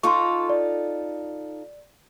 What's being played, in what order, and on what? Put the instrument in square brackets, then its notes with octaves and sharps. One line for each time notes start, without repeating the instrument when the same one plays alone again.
[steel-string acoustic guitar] D#4 F4 A4 [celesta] C6 C#6
[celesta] D5